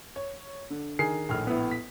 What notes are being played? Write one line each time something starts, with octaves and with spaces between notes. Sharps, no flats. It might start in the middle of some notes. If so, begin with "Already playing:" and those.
C#5
D3
D#3 G#4 C7
A#1 A2 F6
B3 E4
B6